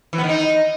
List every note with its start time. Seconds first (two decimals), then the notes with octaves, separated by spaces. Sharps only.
0.13 E3
0.18 B3
0.24 D#3
0.29 D#4